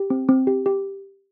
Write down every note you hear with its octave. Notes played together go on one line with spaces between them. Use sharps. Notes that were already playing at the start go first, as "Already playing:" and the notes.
Already playing: G4
C4
C4
G4
G4